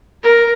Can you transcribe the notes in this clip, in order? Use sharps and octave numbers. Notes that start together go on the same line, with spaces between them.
A#4